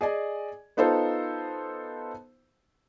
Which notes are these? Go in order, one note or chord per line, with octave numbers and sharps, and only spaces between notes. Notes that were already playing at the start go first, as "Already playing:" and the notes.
G#4 D5 D#5 G#5
B3 D#4 F4 A4 C5